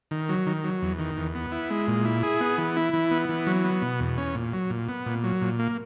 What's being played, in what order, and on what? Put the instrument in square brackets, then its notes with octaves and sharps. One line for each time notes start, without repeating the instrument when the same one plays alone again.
[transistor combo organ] D#3
F#3
D#3
F#3
E2
D#3
E2
B3
E4
G#3
A#2
E4
G#4
B3
E3
E4
E3
B3
E3
F#3
B3
B2
E2
C#4
A#2
F#3
A#2
B3
A#2
F#3
A#2
A#3